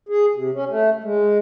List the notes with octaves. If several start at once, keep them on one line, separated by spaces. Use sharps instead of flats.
G#4
C3
C#4
A3
G#3